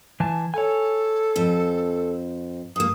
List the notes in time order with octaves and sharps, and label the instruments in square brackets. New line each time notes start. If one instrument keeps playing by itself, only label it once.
[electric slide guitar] E3 G#5 A5
[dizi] A4 [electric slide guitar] C#5 G#5
[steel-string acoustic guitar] F2 C5
[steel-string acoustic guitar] G2 A#3 [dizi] D#6